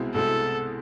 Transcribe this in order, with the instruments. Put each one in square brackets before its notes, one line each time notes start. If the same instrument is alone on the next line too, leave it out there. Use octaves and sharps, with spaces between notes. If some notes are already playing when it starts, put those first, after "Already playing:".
Already playing: [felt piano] C2 B2 G#3 C4 E4
[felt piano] C2 B2 G#3 C4 E4 [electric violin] A4